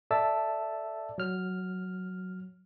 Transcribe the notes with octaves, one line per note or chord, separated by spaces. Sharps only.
A4 D5 E5 A5 E6
F#3 F6